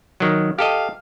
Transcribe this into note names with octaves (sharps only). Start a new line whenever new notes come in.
D#3 F#3
G4 A4 D#5 F5